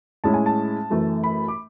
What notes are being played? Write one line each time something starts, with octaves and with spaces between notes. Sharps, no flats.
A2 G#3 C#4 E4 A5
G#5
A5
F#2 E3 A3
B5
D6